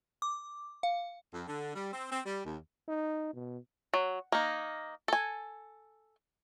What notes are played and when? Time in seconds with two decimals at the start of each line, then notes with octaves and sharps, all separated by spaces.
0.22 D6
0.83 F5
1.33 F2
1.47 D3
1.75 G3
1.93 C4
2.12 C4
2.26 G3
2.45 D#2
2.88 D#4
3.34 B2
3.94 F#3
4.32 A#3 D#4
5.08 A4 G#5